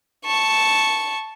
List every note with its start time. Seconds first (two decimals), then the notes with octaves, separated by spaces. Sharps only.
0.26 A5 C#6